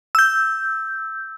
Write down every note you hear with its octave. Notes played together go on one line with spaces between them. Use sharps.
E6 G6